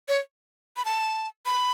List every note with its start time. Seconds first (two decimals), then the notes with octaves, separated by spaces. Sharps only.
0.08 C#5
0.77 B5
0.85 A5
1.46 B5